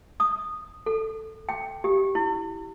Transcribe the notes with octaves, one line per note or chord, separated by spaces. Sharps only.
D#6
A4
G5
G4
E4